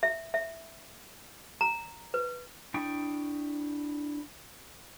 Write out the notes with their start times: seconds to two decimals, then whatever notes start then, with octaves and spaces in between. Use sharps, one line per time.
0.03 E5
0.34 E5
1.61 A#5
2.14 B4
2.74 D4 E4 G5 C#6 D#6